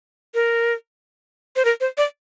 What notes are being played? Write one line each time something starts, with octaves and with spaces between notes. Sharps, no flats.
A#4
C5
A#4
C5
D5